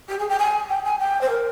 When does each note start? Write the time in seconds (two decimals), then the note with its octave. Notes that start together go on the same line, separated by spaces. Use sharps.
0.09 G4
0.19 G#4
0.29 G5
0.39 G#5
0.69 G5
0.85 G#5
0.99 G5
1.21 C5
1.30 A#4